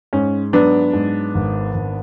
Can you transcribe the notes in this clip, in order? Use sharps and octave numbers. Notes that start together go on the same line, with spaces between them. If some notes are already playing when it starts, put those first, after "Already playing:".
G#2 C#4
F#3 B3 D4
G#2
G#1
G#1